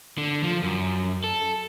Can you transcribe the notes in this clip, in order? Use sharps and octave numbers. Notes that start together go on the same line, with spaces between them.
D3
F3
F#2
A4